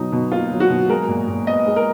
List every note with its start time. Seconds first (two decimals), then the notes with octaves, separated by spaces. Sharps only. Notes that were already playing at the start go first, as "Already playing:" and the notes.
Already playing: B2 F#3 D#4
0.12 B2
0.32 A#3 F4
0.51 F#3
0.60 F#4
0.70 B2
0.89 G#3 A#4
1.08 A#2
1.28 A#2
1.47 B3 D#5
1.66 G#3
1.76 A#4